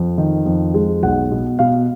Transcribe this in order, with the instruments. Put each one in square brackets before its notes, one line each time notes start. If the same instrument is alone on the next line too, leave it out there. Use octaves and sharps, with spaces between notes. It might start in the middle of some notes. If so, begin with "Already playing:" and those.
Already playing: [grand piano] F2
D#3
F2
G#3
B1 F#5
B2
B2 F5